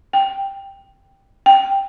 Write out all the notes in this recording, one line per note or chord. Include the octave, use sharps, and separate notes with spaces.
G5
G5